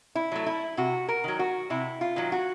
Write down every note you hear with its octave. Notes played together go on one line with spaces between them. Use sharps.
E4
F#3 A3
E4
C3 F#4
A#4
D#3 F#3
F#4
C3 E4
F4
D#3 F#3
F#4